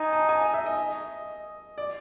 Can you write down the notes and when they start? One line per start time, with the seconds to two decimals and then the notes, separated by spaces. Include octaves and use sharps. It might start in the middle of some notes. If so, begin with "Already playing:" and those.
Already playing: D#4 G#5
0.13 A5
0.29 G#5
0.42 D#5
0.54 E5
0.66 D#5
1.78 D5